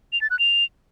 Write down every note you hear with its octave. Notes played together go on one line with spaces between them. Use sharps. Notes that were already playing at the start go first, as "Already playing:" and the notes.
F7
A6
F#6
F7